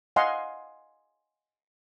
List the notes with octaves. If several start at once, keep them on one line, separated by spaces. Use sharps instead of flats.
D#5 F5 F#5 G#5 C6